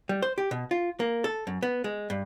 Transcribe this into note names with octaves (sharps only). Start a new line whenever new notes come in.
G3
C5
G4
B2
F4
A#3
A4
F#2
B3
G#3
G2